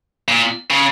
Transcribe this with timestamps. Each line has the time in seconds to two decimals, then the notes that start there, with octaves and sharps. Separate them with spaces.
0.28 A#2
0.70 C#3